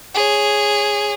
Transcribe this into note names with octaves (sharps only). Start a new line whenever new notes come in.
G#4 C#5